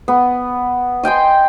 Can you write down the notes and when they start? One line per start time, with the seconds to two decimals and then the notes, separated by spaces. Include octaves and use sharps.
0.08 B3
1.03 D#5 G5 G#5 C6